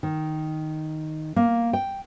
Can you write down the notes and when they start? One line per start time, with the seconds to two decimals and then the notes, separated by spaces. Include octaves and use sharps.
0.03 D#3
1.36 A#3
1.73 G5